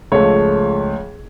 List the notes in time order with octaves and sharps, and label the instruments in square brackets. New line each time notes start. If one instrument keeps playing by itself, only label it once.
[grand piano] C#2 C#3 F3 A3 C#5